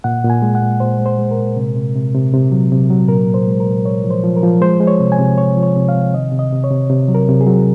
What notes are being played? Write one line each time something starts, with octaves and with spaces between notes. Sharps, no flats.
A#2 F#5
A#2
G#5
G#3
F#5
A#2
A#2 C5
G#3
C5
G#3
A#4
A#2
C3
C3
C3
C3
C3
F#3
C3
F#3
A#2 A#4
A#2
C5
G#3
A#4
A#2
A#2 C#5
F3
C5
F3
A#4
F3
G#3 C5
G#3
C#5
C3
G#5
C3
C3 C#5
F3
C#5
C3
F5
C3
D#3 D#5
C3
D#5
C3
C#5
C3
C3
F#3
A#4
C3
G#4
F#3